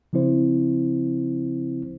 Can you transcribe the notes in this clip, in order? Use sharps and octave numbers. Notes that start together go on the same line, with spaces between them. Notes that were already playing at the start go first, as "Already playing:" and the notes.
C#3 F3 C4 E4 C5